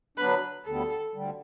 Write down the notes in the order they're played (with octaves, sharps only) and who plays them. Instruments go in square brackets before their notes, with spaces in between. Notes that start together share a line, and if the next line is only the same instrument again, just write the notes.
[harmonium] D3 F#3 B3 D4 [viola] B4
[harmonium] D2 D3 G3 B3 [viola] A4
[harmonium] D2 D3 G3